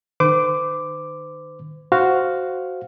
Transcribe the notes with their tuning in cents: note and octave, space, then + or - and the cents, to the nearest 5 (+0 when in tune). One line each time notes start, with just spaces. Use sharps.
D#3 -35 C5 -40 D6 +0
F#4 +5 C5 +0 F5 +0